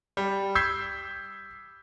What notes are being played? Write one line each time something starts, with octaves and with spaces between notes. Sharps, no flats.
G3
E6 G6 G#6 B6 C7